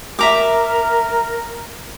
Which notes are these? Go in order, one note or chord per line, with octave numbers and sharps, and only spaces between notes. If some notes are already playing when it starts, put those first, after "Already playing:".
A#4 E5 A#5 D6